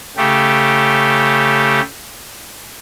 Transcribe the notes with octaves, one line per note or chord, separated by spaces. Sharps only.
C#3 A3 G4